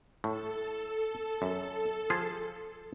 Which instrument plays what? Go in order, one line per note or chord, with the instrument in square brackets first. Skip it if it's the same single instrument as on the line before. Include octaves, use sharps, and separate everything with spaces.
[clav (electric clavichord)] A2 [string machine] A4
[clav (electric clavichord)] F#2
F3 F4 G#4